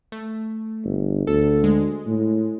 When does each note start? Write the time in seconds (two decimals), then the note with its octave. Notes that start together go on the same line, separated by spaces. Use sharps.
0.12 A3
0.85 G1
1.27 D2 A4
1.64 G#3
2.06 A2